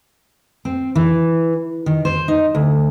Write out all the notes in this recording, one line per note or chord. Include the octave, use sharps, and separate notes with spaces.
C4
E3
D#3
C5
D#4
D2